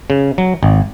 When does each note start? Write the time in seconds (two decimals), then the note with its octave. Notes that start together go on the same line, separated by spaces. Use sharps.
0.10 C#3
0.38 F#3
0.63 G#1